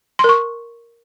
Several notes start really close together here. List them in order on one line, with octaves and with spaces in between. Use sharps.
C6 A#4 C#6